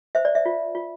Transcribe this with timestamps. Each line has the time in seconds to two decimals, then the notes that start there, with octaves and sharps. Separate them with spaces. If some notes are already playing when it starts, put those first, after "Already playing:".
0.15 C5 E5
0.25 D5
0.35 E5
0.46 F4
0.75 F4